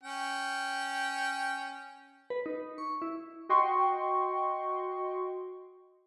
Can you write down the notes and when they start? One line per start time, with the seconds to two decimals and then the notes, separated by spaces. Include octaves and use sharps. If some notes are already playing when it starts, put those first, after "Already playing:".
0.04 C#4 G5
2.30 B4
2.46 D#4
2.78 C#6
3.02 E4
3.49 F#4 D#5 G5 C6 C#6